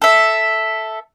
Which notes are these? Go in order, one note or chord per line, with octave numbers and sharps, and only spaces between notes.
A4 E5